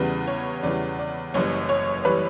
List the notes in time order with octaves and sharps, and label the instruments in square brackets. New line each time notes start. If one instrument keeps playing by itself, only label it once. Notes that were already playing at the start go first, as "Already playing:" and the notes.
Already playing: [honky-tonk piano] E2 C#3 E3 G3 B4
C#5
E2 C#3 E3 G3 D5
D5
F#1 F#2 E3 G3 C#5
C#5
E3 G3 B4